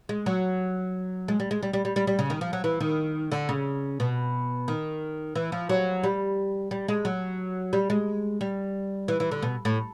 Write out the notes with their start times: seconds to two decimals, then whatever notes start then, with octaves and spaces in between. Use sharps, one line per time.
0.09 G#3
0.26 F#3
1.28 G#3
1.40 G3
1.51 G#3
1.63 G3
1.73 G3
1.85 G3
1.96 G3
2.07 G3
2.19 C#3
2.30 D#3
2.41 F3
2.53 F#3
2.64 E3
2.80 D#3
3.32 D3
3.49 C#3
4.00 B2
4.68 D#3
5.35 E3
5.52 F3
5.69 F#3
6.03 G3
6.71 G3
6.88 G#3
7.05 F#3
7.73 G3
7.90 G#3
8.41 G3
9.08 E3
9.20 E3
9.32 D3
9.42 B2
9.65 A2